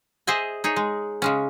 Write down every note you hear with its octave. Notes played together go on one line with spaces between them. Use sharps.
G#4 C5 D#5 E5 G#5
D#4 G#4 C#5
G#3
C#3 G#3 C#4